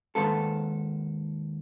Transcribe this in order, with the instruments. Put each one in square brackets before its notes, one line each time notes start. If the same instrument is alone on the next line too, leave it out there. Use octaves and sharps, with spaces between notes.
[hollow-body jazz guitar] D#2 G#2 B3 F4 A4